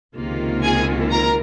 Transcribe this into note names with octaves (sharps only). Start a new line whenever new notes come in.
C#2 C3 D#3 A#3 F4
G#4 G#5
A#4 A#5